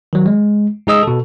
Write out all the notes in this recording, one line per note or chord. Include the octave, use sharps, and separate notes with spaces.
D#3 F#3
G#3
G#2 D#4 G#4 D#5 D#6 E6
B2 A4